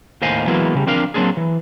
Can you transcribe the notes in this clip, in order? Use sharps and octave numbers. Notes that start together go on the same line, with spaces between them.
D#2 A2 C5 D#5 F5 G#5
E3 F#3 G#3 A#3 B3 E4
C#3 G3
F3 C4 D4 A#4 F5
F#3 A#3 C4 D4 G#4
E3